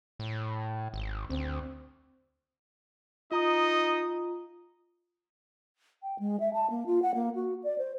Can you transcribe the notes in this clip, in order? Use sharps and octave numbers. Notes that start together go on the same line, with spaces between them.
A2
G#1
D2 C4
D#4 F4 D#5 A#5 D#6
G5
G#3
E5
A5
A#3
F4
F#5
A#3
F#4
D5
C5